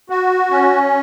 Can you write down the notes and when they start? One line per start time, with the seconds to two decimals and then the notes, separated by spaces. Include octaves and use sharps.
0.10 F#4
0.51 C#4